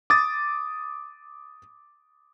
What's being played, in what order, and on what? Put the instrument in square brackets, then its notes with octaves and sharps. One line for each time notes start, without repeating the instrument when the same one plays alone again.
[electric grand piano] D6 D#6 A6